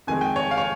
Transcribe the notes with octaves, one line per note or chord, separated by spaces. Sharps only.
F2 D#3 G#3 G#5
G5
C#5
F5
C#5